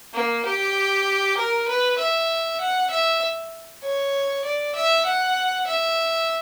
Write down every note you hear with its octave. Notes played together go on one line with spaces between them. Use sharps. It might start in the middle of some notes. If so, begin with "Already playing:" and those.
A#3
G4
A#4
B4
E5
F#5
E5
C#5
D5
E5
F#5
E5